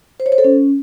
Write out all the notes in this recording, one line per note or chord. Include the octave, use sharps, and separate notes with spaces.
C5
C#5
C5
A4
C#4